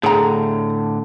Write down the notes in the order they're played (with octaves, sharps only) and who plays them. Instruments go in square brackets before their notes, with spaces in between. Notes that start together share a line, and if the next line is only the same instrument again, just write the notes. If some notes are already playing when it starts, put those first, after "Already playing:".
[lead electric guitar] A2 D3 [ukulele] G#4 A#5